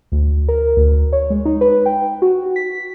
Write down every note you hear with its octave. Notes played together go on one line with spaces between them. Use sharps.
D2
A#4
D2
C#5
G#3
D#4
B4
G5
F#4
B6